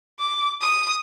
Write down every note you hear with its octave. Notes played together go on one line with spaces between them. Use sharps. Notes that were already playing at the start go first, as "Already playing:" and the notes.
D6
D#6